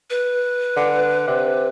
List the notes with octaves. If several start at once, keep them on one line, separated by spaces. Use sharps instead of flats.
B4
D3
C3